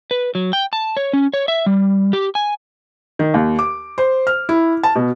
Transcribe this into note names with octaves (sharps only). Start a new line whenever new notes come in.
B4
F#3
G5
A5
C#5
C#4
C#5
E5
G3
G4
G#5
D#3
D#2
D6
C5
F6
E4
A5
B2